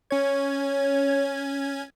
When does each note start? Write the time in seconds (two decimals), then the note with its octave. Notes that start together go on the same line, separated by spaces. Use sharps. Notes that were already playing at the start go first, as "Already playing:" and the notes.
0.11 C#4 C#5 G#6